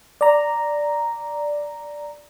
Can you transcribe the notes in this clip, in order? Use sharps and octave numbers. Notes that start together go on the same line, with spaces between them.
D5 A#5